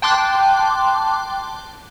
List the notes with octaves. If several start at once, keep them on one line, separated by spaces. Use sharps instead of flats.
G5 A5 C6 D6 F#6